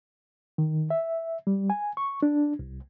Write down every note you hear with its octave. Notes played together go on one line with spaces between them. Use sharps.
D#3
E5
G3
G#5
C#6
D4
C2